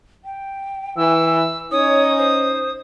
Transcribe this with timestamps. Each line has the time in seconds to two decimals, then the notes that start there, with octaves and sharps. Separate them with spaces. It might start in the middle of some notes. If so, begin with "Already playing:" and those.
0.24 G5
0.97 E3 E6
1.72 C#4 D#4 C#5 D#6
2.18 C5